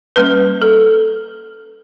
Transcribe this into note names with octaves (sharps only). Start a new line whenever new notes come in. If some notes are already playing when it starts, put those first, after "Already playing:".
G3 A#3 C#4 B4
A4